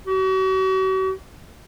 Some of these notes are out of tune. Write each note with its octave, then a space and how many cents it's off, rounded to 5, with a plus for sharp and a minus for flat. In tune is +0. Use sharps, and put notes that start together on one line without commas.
F#4 +40